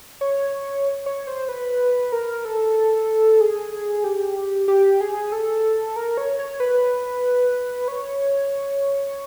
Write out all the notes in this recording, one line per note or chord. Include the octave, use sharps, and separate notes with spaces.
C#5
C#5
C5
B4
A#4
A4
G#4
G4
G4
G#4
A4
A#4
C#5
C#5
B4
C#5